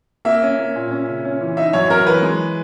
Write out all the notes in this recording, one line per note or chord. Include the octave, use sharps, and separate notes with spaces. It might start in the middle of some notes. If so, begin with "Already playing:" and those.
A#3 E5
C#4
A#3
A#2
C#4
C#3
C#4
E3
D#4 E5
F#2 C#5
F#2 A#4
E3 B4
G#3